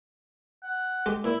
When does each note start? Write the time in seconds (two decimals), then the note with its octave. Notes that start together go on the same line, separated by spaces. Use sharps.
0.63 F#5
1.06 G#3 G4
1.24 A#2 E4